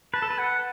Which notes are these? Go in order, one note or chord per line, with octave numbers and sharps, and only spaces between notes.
B4 A5
A4
B4
F#5